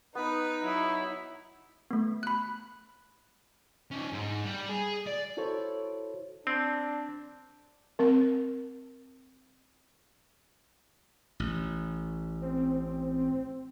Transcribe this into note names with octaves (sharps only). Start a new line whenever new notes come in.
B3 D#4 B4
F#3 E4
A3 B3
B5 F#6
C#4 D#4
G#2
G3
G#4
D5
E4 F#4 A4 C5 C#5
C4 D4
C4 A#4
A1
C4